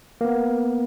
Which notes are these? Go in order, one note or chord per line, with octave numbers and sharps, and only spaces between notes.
A#3 B3